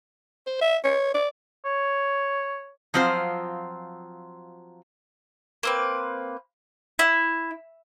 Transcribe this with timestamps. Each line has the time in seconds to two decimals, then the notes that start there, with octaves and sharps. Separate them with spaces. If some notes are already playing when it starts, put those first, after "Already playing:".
0.46 C5
0.61 E5
0.84 C#5
1.14 D5
1.65 C#5
2.94 F3 F#3 C4 F4 C5
5.63 A#3 C4 B4
6.99 E4